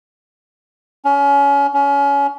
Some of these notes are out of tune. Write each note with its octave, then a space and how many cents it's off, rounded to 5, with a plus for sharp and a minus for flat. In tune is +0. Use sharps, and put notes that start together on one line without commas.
C#4 +30
C#4 +30